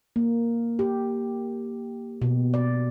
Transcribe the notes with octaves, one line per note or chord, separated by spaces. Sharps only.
A#3
G4
B2
D5